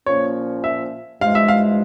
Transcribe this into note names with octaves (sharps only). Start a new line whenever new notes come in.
A#2 F3 A#3 C#4 C#5
E5
G2 F3 G#3 E4 F5
E5
F5